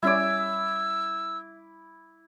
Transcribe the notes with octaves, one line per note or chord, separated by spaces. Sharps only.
G3 C#4 E4 D5 E5 D6 E6 G#6